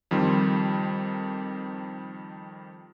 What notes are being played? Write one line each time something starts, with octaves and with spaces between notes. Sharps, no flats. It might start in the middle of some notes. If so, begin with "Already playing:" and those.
F2 D#3 G3 C6